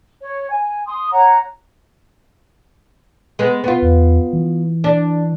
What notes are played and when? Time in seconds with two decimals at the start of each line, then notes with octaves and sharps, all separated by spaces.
0.21 C#5
0.50 G#5
0.87 C6 D#6
1.12 C#5 F#5 A#5
3.39 G#3 B3
3.64 B3 F4
3.82 E2
4.33 E3
4.84 D4